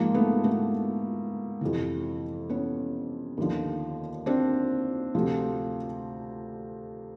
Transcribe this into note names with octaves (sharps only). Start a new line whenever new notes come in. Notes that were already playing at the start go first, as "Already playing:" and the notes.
Already playing: G#2 F3 A#3
A3 B3
A3 B3
F2 C3 E3
B3 C#4
D#2 D3 F3
C4 D4
D2 C3 F3